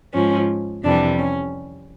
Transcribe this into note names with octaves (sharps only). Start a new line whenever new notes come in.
G#2 F3 C#4
F2 C3 E3 G3 D4
C#4